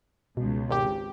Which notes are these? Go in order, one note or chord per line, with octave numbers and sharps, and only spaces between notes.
C#2 B2
G#1 G4